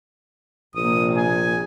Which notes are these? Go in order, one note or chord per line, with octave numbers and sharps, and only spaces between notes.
A#1 C3 A#3 D#6
G#5